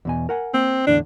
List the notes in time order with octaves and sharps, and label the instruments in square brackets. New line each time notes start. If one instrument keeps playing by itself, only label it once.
[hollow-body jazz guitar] E2 B2 G#5
A#4 F#5 G#5
[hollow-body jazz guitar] A#3 [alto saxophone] C4
[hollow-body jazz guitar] E2 A2 D3 [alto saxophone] D4